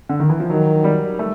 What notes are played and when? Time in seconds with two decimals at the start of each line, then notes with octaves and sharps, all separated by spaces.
0.09 D3
0.20 D#3
0.30 E3
0.40 F3
0.50 D#3 F#3
0.84 G3
1.19 A3